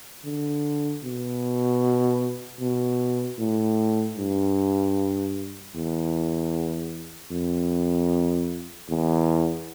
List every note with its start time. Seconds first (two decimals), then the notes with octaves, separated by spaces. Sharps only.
0.24 D3
1.03 B2
2.60 B2
3.39 A2
4.17 G2
5.75 E2
7.31 F2
8.89 E2